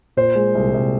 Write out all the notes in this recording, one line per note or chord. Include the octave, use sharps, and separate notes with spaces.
A#2 C5
G#3
C2
C2